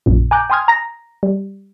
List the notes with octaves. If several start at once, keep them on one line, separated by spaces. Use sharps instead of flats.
A#1 F#2 A#2
G#5 A#5 D6 F#6 G6
G5 G#5 C6 D#6 F6 G#6
A#5 A#6
G3